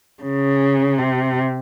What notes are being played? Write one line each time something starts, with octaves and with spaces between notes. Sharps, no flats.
C#3
C3